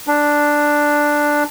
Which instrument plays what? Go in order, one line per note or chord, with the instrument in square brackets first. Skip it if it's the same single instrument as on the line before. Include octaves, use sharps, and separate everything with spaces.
[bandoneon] D4